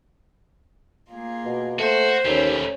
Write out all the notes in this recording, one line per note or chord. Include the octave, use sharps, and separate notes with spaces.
A#3 F4 G#4
B2
A3 F#4 C5
D#2 G3 A3 C#4 C#5